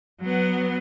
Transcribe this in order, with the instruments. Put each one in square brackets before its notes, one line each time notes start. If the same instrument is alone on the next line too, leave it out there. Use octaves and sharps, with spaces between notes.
[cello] F#3 B3